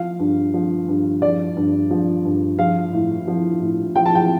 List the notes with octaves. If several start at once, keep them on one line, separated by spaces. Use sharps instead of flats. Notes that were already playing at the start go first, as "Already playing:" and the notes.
Already playing: F3 F5
G2
F3
G2
F3 D5
G2
F3
G2
F3 F5
A2
F3
A2
F3 G5
A5
G5